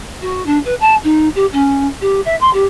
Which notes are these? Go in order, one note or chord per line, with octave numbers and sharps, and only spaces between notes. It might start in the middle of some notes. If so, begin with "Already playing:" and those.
F#4
D4
B4
A5
D#4
G4
C#4
G4
E5
C6
G4